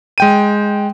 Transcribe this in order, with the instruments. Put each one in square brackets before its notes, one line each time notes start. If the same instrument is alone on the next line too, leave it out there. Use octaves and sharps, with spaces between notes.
[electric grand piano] G#3 G5 D#7